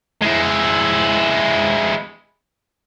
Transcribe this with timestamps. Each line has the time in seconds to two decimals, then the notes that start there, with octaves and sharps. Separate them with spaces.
0.22 G#3 E4